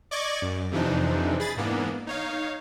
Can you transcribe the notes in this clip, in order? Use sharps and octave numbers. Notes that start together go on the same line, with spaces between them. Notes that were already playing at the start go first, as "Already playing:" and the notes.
D5 D#5 C#6 D6 G#6
F#2
F2 C3 E3 F3 D4 D#4
G#4 B5 A6
G#2 E3 A#3 B3 D4
D#4 C#5 F5